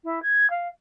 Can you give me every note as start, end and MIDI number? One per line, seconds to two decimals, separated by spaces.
0.04 0.22 64
0.22 0.49 92
0.50 0.68 77